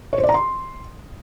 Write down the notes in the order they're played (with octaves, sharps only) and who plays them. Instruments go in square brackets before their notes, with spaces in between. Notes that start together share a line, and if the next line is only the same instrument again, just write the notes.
[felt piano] C#5
C5
D5
A#5
C6